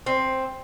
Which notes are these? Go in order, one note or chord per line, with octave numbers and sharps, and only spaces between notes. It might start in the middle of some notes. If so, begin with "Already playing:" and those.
C4